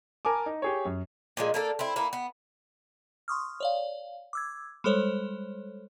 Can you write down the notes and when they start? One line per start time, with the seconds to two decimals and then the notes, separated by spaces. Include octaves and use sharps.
0.25 A#4 G#5 A5 D6
0.46 D#4
0.62 G4 G#4 C#5
0.85 F#2
1.37 A#2 F3 G#3
1.54 A#3 D4 A4
1.79 C4 E4
1.96 A#3 B3 E4
2.13 B3
3.28 C6 C#6 D#6 F6
3.60 C#5 D5 F5
4.33 D6 E6 G#6
4.84 G3 G#3 A4 C5 C#5